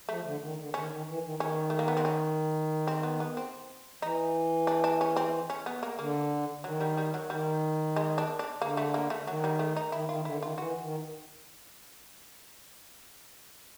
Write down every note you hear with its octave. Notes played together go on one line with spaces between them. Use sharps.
F3 A3
D3
D#3
D3
D#3 C#4
D#3
E3
D#3
D#3 C#4
A3
A#3
B3
C4
C#4
C4
B3
B3
C4
E3 D#4
D4
D4
C#4
C4
C#4
B3
A#3
D3 A#3
D#3 F#3
G3
G3
F#3
D#3 G3
G#3
D4
D4
D3 A#3
A3
A#3
A3
D#3 F#3
G3
A3
D#4
D#3 E4
D#3 F4
D3 E4
D#3 F4
E3 F#4
D#3